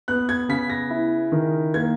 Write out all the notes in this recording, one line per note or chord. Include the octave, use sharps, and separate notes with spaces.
B3 F#6
G#6
C#3 B6
A#6
E4
D#3
A#3 G#6